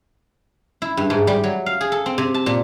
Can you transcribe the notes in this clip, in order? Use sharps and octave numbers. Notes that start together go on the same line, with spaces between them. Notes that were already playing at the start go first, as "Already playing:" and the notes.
E4
G2
G#2
G3
F#3
F5
G#4
A4
C4
C3
A5
A#2